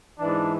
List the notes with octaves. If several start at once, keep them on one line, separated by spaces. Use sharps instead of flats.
G#2 E3 D4